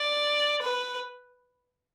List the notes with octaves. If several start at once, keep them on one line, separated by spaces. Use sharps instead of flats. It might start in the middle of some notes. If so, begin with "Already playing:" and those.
Already playing: D5
B4